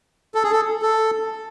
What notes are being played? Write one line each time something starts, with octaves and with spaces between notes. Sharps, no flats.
A4
G#4
A4
A4